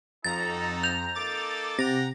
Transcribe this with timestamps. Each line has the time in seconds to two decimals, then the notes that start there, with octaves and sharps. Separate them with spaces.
0.24 F2 D#4 F#4 A4 A#5 A6
0.83 G6 F7
1.14 A#3 D#4 A4 D6 A6
1.79 C3 F#5 G5 A#5 A#6